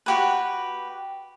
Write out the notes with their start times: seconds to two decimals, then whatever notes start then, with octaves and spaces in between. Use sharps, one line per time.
0.06 F#4 G4 B4